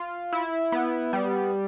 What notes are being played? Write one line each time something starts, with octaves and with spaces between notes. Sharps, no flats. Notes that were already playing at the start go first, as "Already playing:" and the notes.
Already playing: F4
E4
B3
G3